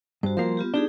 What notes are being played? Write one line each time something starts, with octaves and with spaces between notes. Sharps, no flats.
G2 F#4 C5
F3 G3 A#3 A#4 C6
B3 F4 G4
D4 D#4 G4 G#4